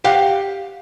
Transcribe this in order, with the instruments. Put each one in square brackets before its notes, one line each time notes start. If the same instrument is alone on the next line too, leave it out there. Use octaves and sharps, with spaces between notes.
[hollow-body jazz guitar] G4 F5 F#5